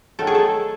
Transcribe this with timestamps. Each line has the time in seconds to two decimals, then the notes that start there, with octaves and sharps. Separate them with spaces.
0.19 D#3 F#3 A3 A4
0.27 G#4
0.35 A4